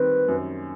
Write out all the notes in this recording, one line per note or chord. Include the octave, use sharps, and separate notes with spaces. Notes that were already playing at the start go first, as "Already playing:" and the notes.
Already playing: D#3 G3 C4 B4
F#2